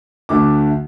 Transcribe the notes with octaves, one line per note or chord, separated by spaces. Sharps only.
D2 D3 A3 D6